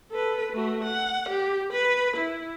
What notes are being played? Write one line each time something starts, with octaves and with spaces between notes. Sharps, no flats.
A4 B4
A3 F#4
F#5
G4
B4 B5
E4